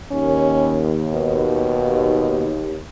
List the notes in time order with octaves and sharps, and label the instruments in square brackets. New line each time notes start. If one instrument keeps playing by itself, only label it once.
[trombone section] D#2 [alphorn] C#4
[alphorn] B2